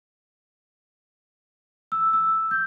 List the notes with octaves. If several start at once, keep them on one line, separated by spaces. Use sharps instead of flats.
E6
E6
G6